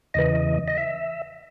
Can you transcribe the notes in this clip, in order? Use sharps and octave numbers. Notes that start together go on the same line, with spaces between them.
E2 C#3 E3 D#5
D#5
E5